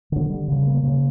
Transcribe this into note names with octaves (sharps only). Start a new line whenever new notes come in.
D3
G3
C#3
A#3
C#3